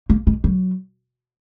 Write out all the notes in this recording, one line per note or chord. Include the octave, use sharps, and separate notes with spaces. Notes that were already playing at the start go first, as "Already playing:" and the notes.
A#3
G#3
F#3